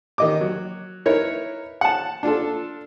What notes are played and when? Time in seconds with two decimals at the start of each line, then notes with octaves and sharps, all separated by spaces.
0.18 D#3 D#5 D6
0.41 F#3
1.06 D#4 E4 A#4 B4 C#5
1.81 F#5 A5
2.23 D4 F4 A4